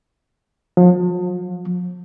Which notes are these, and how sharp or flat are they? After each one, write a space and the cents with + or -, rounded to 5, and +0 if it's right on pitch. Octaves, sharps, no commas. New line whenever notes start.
F3 +40